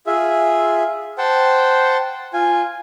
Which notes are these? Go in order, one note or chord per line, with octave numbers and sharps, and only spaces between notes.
F4 G#4 E5
C5 F#5 G5 A5
F4 G#5